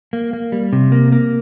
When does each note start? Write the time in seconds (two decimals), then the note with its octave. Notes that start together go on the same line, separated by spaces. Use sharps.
0.13 A#3
0.33 A#3
0.52 G3
0.73 C3
0.92 A#3
1.12 A#3